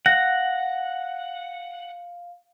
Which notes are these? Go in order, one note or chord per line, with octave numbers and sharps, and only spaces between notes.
F5 F#5 A#6